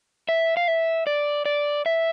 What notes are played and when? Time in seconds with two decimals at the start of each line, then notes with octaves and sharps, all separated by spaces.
0.29 E5
0.57 F5
0.68 E5
1.07 D5
1.46 D5
1.86 E5